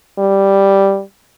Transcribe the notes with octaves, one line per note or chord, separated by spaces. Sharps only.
G3